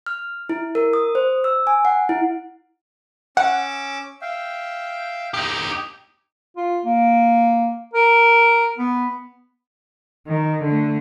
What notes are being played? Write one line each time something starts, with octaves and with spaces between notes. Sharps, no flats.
F6
E4
A#4
D#6
C5
E6
G#5
F#5
E4
C#4 F#5 D6 E6
E5 F5 G5
D#4 G4
F4
A#3
A#4
B3
D#3
D3 A3